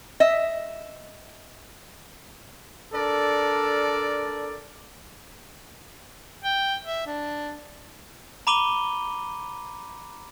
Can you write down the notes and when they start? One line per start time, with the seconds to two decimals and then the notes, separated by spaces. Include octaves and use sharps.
0.20 D#5 E5
2.93 D4 A4 A#4 D5
6.44 G5
6.84 E5
7.06 D4
8.47 A#5 B5 D6 D#7 F7 G7